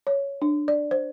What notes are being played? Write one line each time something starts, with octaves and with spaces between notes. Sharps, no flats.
C#5
D4
D5
C5